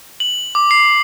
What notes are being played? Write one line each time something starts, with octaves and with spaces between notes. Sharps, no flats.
F#7
D6
C7